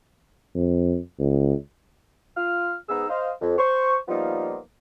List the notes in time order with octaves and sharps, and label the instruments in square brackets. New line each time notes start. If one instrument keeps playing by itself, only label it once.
[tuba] F2
C#2
[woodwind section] F4 F6
G#2 B3 D#4 G#4 E6
C5 D#5 F5
F2
C5 C#6
F3 G3 A#3 B3 D#4 F4